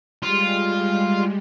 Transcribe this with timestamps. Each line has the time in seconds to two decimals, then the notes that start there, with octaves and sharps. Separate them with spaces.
0.22 G3 G#3 F4